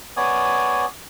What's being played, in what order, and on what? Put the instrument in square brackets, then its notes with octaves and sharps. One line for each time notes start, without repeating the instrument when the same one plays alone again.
[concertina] B3 C#5 D5 G#5 D#6